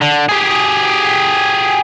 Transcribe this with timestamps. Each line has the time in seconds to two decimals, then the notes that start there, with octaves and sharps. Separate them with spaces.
0.02 D3
0.29 G4 G#4